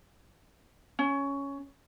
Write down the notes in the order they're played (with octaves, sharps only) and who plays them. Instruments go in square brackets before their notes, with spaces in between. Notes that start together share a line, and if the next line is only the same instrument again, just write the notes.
[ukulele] C#4